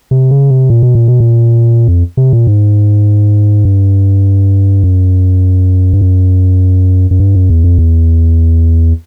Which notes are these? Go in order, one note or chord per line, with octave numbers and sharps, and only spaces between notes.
C3
C#3
C3
A#2
B2
A#2
B2
A#2
F2
C3
A#2
G#2
G2
F#2
G2
F#2
F#2
G2
F#2
E2
F2
E2